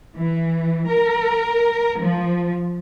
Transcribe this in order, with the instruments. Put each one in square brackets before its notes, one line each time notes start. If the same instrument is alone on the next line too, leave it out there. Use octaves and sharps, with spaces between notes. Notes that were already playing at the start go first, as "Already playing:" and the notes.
[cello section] E3
A#4
F3